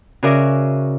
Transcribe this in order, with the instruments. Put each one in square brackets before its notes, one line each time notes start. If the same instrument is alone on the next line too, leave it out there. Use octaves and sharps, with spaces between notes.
[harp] C#3 F#4 A#4 D5 E5